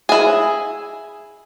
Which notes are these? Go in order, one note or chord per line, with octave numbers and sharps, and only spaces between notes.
E4 G#4